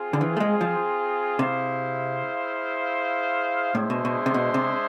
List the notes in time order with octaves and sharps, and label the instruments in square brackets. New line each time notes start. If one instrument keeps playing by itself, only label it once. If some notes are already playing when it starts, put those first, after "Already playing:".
Already playing: [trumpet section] C4 F4 G#4
[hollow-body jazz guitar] D3
E3
A3
G#3
F3
[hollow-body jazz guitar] C3 [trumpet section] E4 G#4 C5 F5
[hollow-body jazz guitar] A2 [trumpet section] G#3 D4 G#4 C5 E5
[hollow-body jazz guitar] B2
B2
C3
B2
C3